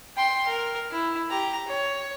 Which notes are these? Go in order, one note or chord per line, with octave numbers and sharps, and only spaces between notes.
G5 C6
A#4
E4
G4 A#5
C#5